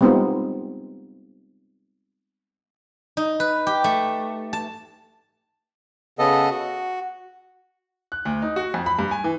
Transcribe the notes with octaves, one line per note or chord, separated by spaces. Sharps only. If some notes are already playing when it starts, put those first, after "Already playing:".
G3 G#3 B3 C4 D#4 F4
D#4
B4
G4
A3
A5
C#3 B3 A4 D#5
F#4
F#6
D2
D#4
F#4
F2
B5
G2
G#5
E3